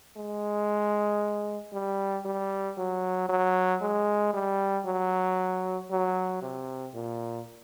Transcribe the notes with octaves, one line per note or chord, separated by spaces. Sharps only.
G#3
G3
G3
F#3
F#3
G#3
G3
F#3
F#3
C3
A#2